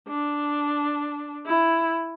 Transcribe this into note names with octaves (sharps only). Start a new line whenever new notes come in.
D4
E4